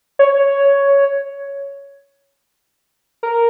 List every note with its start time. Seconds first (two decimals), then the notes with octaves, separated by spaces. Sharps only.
0.19 C#5
3.23 A#4